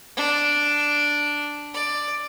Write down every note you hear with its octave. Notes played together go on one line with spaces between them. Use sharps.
D4
D5